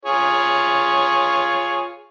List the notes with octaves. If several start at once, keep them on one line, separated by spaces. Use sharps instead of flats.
F4 G#4 C#5